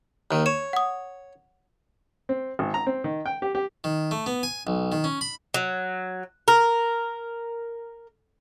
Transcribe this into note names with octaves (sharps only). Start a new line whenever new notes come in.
D#2 D#3
C#5 E7
F#5 D#6
C4
G#1
A#5
C4
D#3
G5
G4
G4
D#3
A3
B3
G#5
B1
D#3
C#4
B5
F#3
A#4